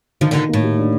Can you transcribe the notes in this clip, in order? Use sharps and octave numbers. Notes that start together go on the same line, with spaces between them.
D3 D#3 F3
A#2 D3 D#3
A2 A#3
G4
D4